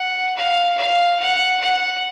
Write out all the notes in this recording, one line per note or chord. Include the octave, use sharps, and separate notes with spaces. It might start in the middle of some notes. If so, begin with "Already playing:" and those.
Already playing: F#5
F5
F5
F#5
F#5